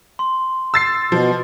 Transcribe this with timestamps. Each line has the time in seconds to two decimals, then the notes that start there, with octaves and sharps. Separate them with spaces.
0.19 C6
0.74 E6 A6 C7
1.12 B2 F3